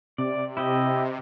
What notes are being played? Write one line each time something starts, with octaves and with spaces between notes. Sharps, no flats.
C3 D5
E4 G4 D#5